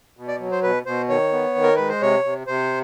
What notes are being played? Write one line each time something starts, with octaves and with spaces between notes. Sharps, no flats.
B2
D5
F#3
C5
B2 B4
B2 C5
D#3 C#5
B3
D#3
A#4
G#3 B4
C5
C3 C#5
C3
C3 C5